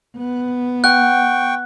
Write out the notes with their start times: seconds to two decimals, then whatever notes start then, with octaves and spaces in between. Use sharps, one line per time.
0.17 B3
0.84 F#5 G5 C#6 F#6